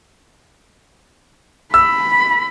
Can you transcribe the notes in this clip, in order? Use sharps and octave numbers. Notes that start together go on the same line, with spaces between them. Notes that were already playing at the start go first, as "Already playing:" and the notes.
B5 E6